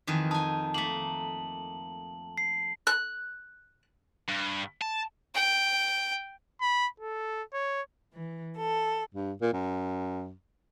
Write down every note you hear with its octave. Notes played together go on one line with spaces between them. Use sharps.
F2 D#3 E3
D#4 G#5 A5
A3 A#3 F#7
C7
F#6
G2
A5
G5
B5
A4
C#5
E3
A4
G2
A#2
F#2